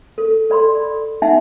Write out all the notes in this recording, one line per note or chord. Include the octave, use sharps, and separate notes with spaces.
A4
A4 D5 B5 C6
D#4 E5 F#5 G#5 A5